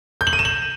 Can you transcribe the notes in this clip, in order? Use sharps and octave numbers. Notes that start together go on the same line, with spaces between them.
G6
F#7
D#7
E7
F#7